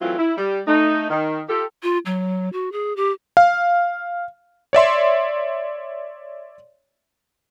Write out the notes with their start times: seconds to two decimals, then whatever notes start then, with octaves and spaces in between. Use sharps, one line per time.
0.01 E3 F#3 A3 C4 E4 F4
0.19 E4
0.38 G3
0.67 A3 D#4
1.10 D#3
1.49 F4 G4 A4
1.83 F4
2.06 F#3
2.53 F#4
2.72 G#4
2.96 G4
3.37 F5
4.73 C#5 D5 E5 C6